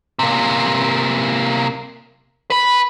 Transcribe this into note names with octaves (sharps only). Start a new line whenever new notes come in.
C3 A#3
B4 B5